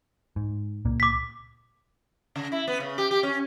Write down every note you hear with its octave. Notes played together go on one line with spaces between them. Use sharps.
G#2
C#2 A#2 A#3
D6 B6
C#3
E4
B3
C#3
G4
G4
C#4